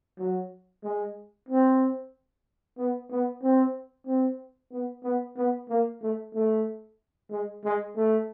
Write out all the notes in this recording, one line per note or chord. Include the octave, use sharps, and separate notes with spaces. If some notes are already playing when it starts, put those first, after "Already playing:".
F#3
G#3
C4
B3
B3
C4
C4
B3
B3
B3
A#3
A3
A3
G#3
G#3
A3